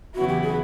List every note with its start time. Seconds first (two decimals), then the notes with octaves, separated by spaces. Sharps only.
0.15 E2 C#3 F#3 B3 E4 F#4
0.29 G4
0.43 G#4